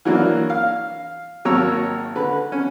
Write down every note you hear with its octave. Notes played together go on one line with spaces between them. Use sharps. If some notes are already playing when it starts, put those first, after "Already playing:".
E3 F#3 A#3 D4
F5
G#1 F#3 A#3 C#5 A#5 E6
D3 B4
C#4